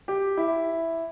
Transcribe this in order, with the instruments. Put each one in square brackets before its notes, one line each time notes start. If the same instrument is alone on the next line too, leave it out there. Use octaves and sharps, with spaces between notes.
[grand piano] G4
E4